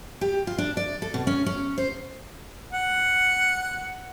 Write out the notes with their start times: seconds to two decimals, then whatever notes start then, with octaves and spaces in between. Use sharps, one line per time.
0.21 G4
0.47 F4
0.58 D4
0.77 D5
1.02 A4
1.14 B2
1.27 C#4
1.46 C#4
1.78 C5
2.72 F#5